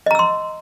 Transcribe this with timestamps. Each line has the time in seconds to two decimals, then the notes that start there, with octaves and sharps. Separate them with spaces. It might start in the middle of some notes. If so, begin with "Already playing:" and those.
0.06 D#5
0.11 A#5
0.15 E6
0.19 C6